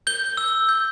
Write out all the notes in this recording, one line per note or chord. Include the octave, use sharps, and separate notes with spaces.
G6 G7
E6
G6